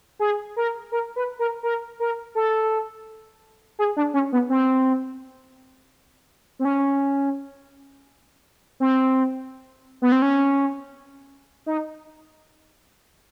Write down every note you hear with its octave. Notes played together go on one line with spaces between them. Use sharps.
G#4
A#4
A#4
B4
A#4
A#4
A#4
A4
G#4
D4
C#4
B3
C4
C4
C#4
C4
B3
C4
C#4
D#4